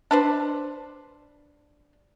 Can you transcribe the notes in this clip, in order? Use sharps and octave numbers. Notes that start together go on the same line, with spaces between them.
D4 B4 C5